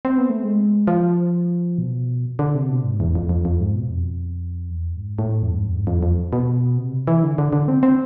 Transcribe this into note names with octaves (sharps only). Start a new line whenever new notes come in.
C4
B3
A3
G#3
F3
B2
D3
C3
B2
G#2
E2
F2
F2
F2
G#2
B2
F2
E2
F2
G#2
A2
F2
G#2
F2
G#2
F2
F2
B2
C3
E3
D3
D3
D3
C4
C4